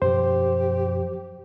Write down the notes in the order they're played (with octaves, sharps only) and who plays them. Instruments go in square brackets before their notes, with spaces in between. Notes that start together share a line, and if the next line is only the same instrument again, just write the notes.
[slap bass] F#2 B2 F3 [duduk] G4 [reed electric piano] C5